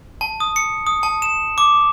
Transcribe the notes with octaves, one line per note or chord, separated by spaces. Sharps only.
A5
D#6
C#7
D#6
A5
E7
D6